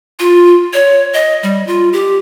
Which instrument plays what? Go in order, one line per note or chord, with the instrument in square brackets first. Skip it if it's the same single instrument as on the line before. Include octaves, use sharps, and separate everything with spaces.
[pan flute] F4
C#5
D#5
G3
F4
G4